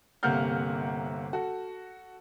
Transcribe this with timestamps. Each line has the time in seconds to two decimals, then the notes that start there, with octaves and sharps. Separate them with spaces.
0.23 G1 C3 A#3 F#5 F6 G6
1.33 F#4 A4